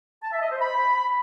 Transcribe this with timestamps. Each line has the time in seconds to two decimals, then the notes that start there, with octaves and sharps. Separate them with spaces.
0.23 A5
0.32 E5
0.42 D#5
0.51 C5
0.61 B5